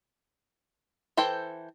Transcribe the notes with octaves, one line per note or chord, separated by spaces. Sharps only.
E3 A4 C5 G5